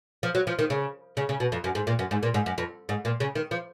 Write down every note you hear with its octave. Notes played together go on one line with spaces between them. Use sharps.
F3
F#3
F3
D#3
C#3
C#3
C#3
B2
F2
F#2
G#2
A#2
F#2
G#2
A#2
G#2
F#2
F2
G#2
A#2
C#3
D#3
F3